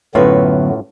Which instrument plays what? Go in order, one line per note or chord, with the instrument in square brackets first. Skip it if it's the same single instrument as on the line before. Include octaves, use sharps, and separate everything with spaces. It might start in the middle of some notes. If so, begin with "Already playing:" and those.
[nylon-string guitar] F#2 B4 C#5 [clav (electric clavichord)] A2 F4 [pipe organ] D3 F#3 B3